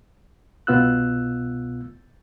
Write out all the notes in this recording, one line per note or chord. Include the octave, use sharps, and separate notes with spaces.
C2 B2 B3 F4 E6 F#6